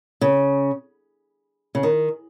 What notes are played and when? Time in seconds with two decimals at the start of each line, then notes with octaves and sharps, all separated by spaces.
0.21 C#3
1.75 C#3
1.83 D#3